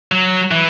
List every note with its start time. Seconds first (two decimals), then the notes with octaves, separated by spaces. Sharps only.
0.12 F#3
0.51 E3